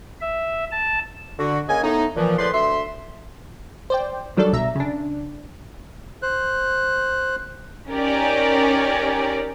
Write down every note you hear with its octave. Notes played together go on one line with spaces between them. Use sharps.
E5
A5
D3 F#4
C#3 A#3 D#5 G#5
A2 A3 B3 D#4
A#2 E3 F3
E2 A2 F3 B4 D5 C6
D2 E5 C6
C5 D5 G5
D#3 F#3 G3 D4 A4 D5
C2 B2 E5 A#5
C#3 D4
C5 F#6
C#4 D#4 G4 A#4 D5